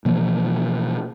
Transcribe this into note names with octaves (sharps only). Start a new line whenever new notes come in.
B2 E3 F3 A#3